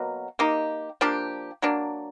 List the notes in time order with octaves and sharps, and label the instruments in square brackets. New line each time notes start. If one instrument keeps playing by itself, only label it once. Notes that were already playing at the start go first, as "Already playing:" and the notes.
Already playing: [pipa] B2 F#3 A#3
A#3 D#4 G4
F3 A#3 D4 G4
F#3 A#3 D4